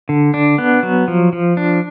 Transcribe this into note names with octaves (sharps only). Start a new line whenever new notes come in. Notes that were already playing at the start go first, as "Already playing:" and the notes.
D3
D4
B3
F#3
F3
F3
D4